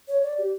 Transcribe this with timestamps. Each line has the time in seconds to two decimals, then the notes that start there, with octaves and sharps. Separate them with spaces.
0.08 C#5
0.23 D5
0.38 G4